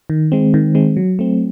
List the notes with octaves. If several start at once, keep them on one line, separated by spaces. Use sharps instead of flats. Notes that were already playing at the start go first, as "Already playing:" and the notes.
D#3
G#3 C4
D#3
G#3 C4
F#3
A3 C4